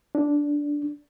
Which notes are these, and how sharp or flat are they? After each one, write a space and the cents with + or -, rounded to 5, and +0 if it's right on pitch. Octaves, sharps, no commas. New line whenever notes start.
D4 -10